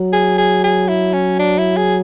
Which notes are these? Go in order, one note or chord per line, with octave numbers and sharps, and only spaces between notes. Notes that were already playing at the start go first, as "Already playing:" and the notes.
Already playing: F#3
G#4
G#4
G#4
E4
C#4
D4
E4
G#4